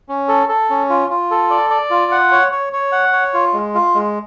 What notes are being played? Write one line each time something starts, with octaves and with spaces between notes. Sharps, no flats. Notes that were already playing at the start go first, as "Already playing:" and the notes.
C#4
A4
A4
C#4
F4
F4
A4
D5
D5
F4
F#5
C#5
C#5
C#5
F#5
C#5
F4
G#3
F4
G#3